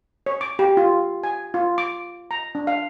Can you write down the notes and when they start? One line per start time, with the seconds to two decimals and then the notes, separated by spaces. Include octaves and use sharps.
0.26 C#5
0.41 D6
0.59 G4
0.77 F4
1.24 G#5
1.54 F4
1.78 D6
2.31 A#5
2.55 D4
2.67 F5